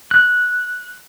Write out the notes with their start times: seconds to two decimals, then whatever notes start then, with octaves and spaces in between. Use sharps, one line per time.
0.11 F#6